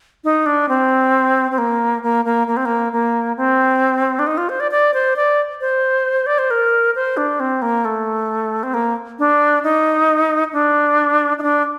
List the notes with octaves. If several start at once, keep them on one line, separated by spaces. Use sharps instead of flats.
D#4
D4
C4
C4
A#3
A#3
A#3
A#3
C4
A#3
A#3
C4
D4
D#4
F4
C5
D5
D5
C5
D5
C5
D5
C5
A#4
C5
D4
C4
A#3
A3
C4
A#3
D4
D#4
D4
D#4
D4